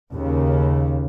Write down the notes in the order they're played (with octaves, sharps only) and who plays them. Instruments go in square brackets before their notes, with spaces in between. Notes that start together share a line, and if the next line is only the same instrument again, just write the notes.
[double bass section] D#2 C#3